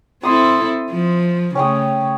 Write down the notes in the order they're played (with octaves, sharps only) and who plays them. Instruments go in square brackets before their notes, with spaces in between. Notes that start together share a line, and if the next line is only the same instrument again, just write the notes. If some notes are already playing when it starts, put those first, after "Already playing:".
[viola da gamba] C4 E4 A4 [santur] C6 D#6
[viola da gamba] F3
[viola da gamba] C#3 A3 [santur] C#4 G5 D#6